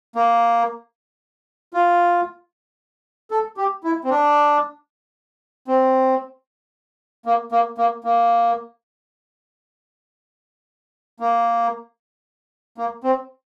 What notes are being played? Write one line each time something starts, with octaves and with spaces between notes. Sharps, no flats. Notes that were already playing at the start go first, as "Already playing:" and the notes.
A#3
F4
A4
G4
E4
C4
D4
C4
A#3
A#3
A#3
A#3
A#3
A#3
C4